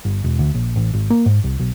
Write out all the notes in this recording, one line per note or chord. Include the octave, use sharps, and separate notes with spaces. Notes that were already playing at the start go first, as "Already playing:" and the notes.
G1
E1
D2
A#1
A1
G#1
A#3
G#2
C2
B1